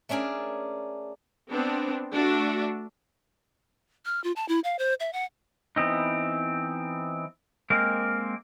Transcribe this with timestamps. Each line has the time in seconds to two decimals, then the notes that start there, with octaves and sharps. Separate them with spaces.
0.09 A3 C#4 D4 G#4 A#4
1.52 B3 C4 D4
2.12 A3 D4 F#4 E5
4.05 F6
4.24 F4
4.36 A5
4.48 E4
4.64 F5
4.79 C5
5.00 E5
5.13 F#5
5.76 E3 B3 C4 D#4
7.70 G#3 A#3 C4 A#4